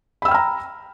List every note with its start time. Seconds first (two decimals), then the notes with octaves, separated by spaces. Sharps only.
0.22 B5
0.25 E6
0.28 G5
0.31 F6
0.34 A#5